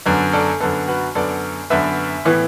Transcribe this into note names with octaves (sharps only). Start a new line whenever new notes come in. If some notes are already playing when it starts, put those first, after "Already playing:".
F#2 D3 B3
A4 D5
F#2 D3 B3 A4
F#4 B4
F#2 D3 B3 A4 D5
F#2 D3 B3 B4 E5
A2 E3 B3